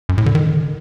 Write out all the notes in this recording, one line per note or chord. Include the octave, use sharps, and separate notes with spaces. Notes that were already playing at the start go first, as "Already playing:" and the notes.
F#2
A2
D3
D#3